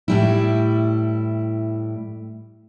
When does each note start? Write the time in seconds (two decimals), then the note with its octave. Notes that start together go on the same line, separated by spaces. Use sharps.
0.08 A2 G3 E4